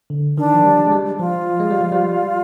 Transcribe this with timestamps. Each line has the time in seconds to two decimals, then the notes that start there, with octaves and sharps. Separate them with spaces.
0.10 D3
0.37 D#3 D4
0.54 F3
0.64 G3
0.86 G#3
0.92 G3
1.19 F3 F4
1.60 G#3
1.70 G3
1.81 F3
1.92 G3